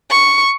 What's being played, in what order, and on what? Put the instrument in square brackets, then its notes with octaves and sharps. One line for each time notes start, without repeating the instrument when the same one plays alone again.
[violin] C#6